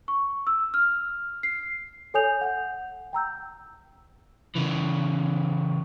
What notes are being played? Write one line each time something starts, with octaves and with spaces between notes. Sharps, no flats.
C#6
E6
F6
C7
A4 C#5 G#5 D#6 G6 F7
F#5 G6
G5 A#5 E6 G6
C#3 E3